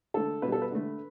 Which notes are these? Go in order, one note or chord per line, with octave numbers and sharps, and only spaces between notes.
D3 A3 A4
B2 G3 B4
A4
B4
D3 A3